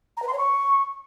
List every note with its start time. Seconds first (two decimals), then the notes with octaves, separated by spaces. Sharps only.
0.17 A#5
0.22 B4
0.28 C6
0.33 C#5
0.38 C#6